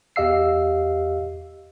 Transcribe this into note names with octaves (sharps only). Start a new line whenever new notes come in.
E2 G4 D#5 F5 E6 C7